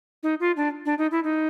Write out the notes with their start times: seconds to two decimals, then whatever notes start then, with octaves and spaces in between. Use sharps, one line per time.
0.23 D#4
0.40 F4
0.57 D4
0.86 D4
0.98 D#4
1.11 E4
1.24 D#4